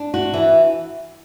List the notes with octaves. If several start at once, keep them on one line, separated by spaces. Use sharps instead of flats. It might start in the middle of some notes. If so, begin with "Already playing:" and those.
Already playing: D4
F#4
E3